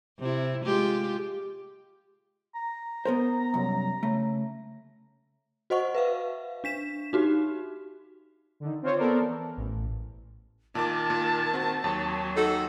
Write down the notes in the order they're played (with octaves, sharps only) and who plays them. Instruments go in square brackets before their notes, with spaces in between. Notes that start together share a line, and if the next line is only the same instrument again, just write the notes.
[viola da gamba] C3 E4
G#3 F4 G4
[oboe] A#5
[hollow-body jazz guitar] B3 A#4 C5
C2 F#2
C#3 A3
[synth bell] F#4 C5 D#5 F#5 C#6
B4 E5 F5
D4 B6 E7
D#4 F#4 G4
[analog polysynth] D3 D#3
C4 F4 C5 C#5
B3 A4 A#4 C5 D5
E3
A1
[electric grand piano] A#2 D6 [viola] D#3 [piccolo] A5
[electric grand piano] A#2
C4 F#4
[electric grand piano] D#2 [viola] F#3
[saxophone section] D#4 F#4 A4